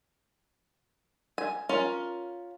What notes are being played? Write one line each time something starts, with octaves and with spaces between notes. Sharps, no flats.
G#5
C#4 F4 A#4